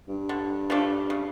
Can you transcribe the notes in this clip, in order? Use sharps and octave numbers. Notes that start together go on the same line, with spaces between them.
G2
D3
F3 A3 D4
C#3